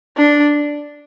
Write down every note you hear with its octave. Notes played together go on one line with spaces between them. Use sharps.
D4